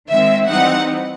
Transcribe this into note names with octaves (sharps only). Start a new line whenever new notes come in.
D#3 G#3 C4 E5
E3 G3 C4 D#4 F#5